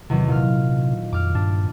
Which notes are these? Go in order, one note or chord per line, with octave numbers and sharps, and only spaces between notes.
E2 C3 D#3 F#3
A#2 F6
F2 D6 F6
G2 D4